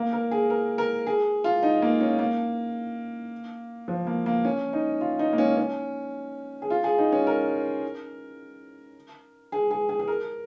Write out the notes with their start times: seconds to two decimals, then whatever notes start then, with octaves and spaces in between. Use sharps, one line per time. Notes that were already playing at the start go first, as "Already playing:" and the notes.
Already playing: A#3
0.13 A#4
0.31 G#4
0.50 A#4
0.78 A#4
1.07 G#4
1.44 F4
1.63 D#4
1.82 A#3
2.00 C#4
2.19 A#3
3.88 F3
4.07 A#3
4.26 A#3
4.45 C#4
4.73 D#4
5.01 F4
5.19 D#4
5.33 A#3
5.38 C#4
5.57 C#4
6.62 G#4
6.70 F4
6.84 G#4
6.98 D#4
7.12 C#4
7.27 A#4
9.52 G#4
9.71 G#4
9.89 G#4
9.99 G#4
10.08 A#4